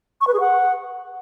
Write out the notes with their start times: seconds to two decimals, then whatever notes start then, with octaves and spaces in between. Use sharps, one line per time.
0.21 C#6
0.27 B4
0.34 G#4
0.40 F#5